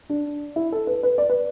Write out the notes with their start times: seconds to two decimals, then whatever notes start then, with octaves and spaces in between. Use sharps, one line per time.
0.10 D4
0.56 E4
0.72 A4
0.87 B4
1.03 B4
1.18 D5
1.30 B4